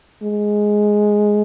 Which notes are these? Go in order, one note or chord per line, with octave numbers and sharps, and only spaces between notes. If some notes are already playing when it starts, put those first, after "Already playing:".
G#3